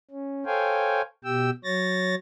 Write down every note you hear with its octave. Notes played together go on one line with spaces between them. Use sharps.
C#4
A4 C5 C#5 F5 G5 G#5
B2 G4 G5 E6
F#3 C#5 A6 A#6